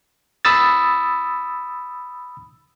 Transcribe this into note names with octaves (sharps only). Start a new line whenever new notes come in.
B5 D#6 E6 A6